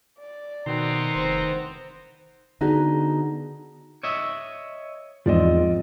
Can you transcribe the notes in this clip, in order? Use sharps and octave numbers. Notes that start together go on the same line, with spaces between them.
D5
B2 D#3 B3 C4 A#5 C6
F1 C5
D3 B3 D#4 F#4 G#4
C#5 D#5 E5
E2 G#2 F3 C4 F4 D5 D#5